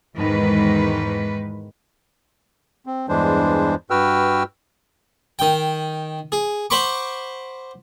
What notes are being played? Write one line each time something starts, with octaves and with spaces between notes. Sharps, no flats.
E2 G#2 D#3 B4
C4
E2 G2 E3 G#3 D4 C5
G2 F#4 B4 G5 E6 F6
D#3 G5
G#4
C5 F#5 B5 C#6 D6